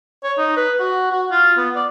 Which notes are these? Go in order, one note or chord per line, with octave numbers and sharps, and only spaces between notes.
C#5
D#4
B4
F#4
F#4
F4
B3
D5